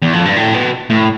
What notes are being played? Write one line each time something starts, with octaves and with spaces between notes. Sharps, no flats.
E2
F2
G2
A2
B2
A2